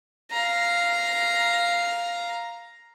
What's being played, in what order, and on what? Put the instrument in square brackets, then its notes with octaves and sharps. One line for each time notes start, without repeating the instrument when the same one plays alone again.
[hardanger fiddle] F5 A#5